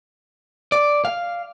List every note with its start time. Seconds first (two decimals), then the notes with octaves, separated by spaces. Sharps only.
0.72 D5
1.05 F5